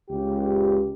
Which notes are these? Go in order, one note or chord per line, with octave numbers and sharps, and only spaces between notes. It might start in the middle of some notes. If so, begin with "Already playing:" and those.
C#2 G4